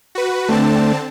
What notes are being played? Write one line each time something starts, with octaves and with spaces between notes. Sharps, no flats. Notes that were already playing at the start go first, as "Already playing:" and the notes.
F#4 B4
D3 A3 C4 D4 A5